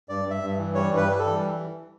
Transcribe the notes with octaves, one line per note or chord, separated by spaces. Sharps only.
G2 D5
G2
E5
G2
E3
G3 C#5
G2
B4
G3 B4
A4
E3